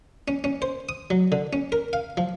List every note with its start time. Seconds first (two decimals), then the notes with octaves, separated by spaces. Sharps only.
0.28 C#4
0.44 C#4
0.62 C5
0.89 D#6
1.10 F#3
1.32 D3
1.53 C#4
1.72 A#4
1.93 F5
2.17 F3